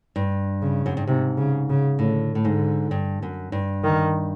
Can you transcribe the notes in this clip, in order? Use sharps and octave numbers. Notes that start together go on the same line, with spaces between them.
G2
C#3
F#2
G2
G#2 C3
C#3
C#3
A2 D3
A2
G#2 D3
G2
F#2
G2
D#3